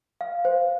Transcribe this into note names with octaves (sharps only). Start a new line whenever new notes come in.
F5
C5